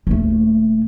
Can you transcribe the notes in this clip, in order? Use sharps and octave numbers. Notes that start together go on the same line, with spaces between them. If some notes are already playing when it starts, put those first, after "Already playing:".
D#1 A3